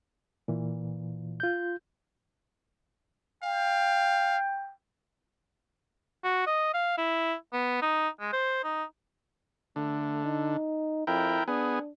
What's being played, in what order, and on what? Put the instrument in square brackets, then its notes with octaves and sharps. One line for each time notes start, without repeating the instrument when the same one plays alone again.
[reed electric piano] A#2 E3
F4 G6
[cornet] F5 [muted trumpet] G5
[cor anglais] F#4
D#5
F5
E4
B3
D#4
G#3
C5
D#4
[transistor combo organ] D3 [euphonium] A3
[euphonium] D#4
[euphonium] F2 [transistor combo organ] E4 A#4 G5
[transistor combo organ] B3 G#4 [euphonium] D4